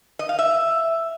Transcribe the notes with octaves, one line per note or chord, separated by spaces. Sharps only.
D#5
F5
E5